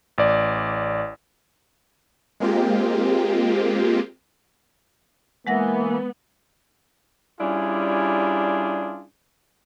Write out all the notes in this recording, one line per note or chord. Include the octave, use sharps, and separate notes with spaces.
A1 D5
G#3 A#3 C4 F4 G4
E3 G#3 A#3 B3 F#5 A#6
G3 C#4 D4 E4 F4 G#4